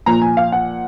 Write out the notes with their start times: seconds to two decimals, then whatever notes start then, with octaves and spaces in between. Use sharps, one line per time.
0.06 A#2 F3 A#5
0.22 G#5
0.37 F5
0.52 F#5